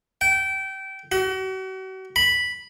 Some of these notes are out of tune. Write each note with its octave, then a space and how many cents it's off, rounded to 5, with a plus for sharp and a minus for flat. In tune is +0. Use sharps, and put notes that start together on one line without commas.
G5 -25
F#4 +40
B5 -5